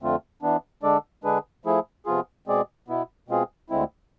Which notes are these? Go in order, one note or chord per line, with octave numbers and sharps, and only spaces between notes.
F2 D3 A3 C4 F4
E3 B3 D4
D3 G#3 D4 A4 D5
D3 G#3 D4 G#4 B4
F3 A3 E4 G#4
C3 F3 B3 F4 G#4
B2 G#3 C4 G#4 D5
B2 B3 E4
B2 G#3 C4 F4 G#4
D2 D3 G#3 C4 E4